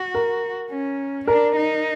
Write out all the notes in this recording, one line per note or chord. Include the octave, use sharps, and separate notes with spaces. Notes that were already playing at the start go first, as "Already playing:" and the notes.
Already playing: F#4
A#4
C#4
D4 A#4
D#4